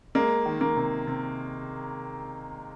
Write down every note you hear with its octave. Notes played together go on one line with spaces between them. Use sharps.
G#3 A#3
D#3
A#3
C3
C3